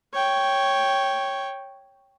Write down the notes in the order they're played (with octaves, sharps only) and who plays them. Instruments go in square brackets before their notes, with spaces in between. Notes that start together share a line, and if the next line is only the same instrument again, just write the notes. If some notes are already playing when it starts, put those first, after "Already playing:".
[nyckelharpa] C#5 G5